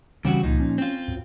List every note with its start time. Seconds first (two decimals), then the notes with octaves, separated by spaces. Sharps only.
0.25 C#3 E3 G3 C4 F#4
0.43 C#2 A#2 F3 D#4
0.60 C#4
0.78 C4 F4
1.08 F#2